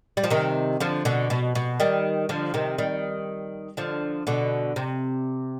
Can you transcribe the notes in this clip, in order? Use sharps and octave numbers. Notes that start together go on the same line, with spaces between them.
G3
F3
C3 D#3
D3 F3
B2 D3
B2
B2
D#3 G3
D3 F3
C3 D#3
D#3 G3
D3 F3
B2 D3
C3